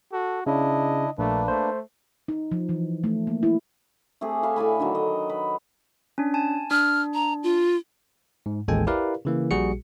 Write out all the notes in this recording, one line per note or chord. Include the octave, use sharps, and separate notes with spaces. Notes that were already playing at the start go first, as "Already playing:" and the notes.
F#4 A4
C#3 D4 E4 D#5
A#1 A3 A#3 D4 B4
A3 C5
D#4
F3
E3
A3
A#3
E4
A3 C4 G4 G#4
C#5 E5 F5 B5
A2 D5 G#5 B5
D3 D#3 F#3
D#5
B4
C#4 D4
G#5 A5
D4 F6
A#5
F4
G#2
A1 D#2 G#3 A4 G5 G#5
E4 G4 A#4 B4 D5 F5
C#3 E3 A#3
A#1 A#2 G3 F#4 G#4 C#7